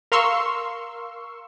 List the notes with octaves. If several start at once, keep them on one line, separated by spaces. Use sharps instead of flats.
A#4 F5 C6 C#6 E6